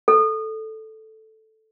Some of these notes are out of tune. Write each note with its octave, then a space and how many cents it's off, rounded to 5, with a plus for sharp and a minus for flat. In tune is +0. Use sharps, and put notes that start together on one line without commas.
A4 +0